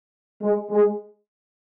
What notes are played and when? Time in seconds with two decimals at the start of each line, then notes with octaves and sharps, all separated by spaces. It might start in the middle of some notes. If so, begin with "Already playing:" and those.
0.41 G#3
0.70 G#3